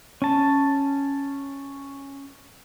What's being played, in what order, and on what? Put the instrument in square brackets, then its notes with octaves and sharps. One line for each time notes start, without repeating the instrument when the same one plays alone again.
[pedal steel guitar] C#4 A5